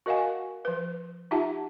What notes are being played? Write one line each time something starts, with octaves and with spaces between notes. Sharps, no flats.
F#4 A#4 D#5 F5 F#5 G#5
F3 B4
D#4 F4 G4 E5 F#5 A5